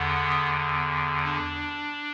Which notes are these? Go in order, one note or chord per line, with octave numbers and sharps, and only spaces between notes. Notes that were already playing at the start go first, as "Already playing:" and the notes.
Already playing: E2 D3 B3
D4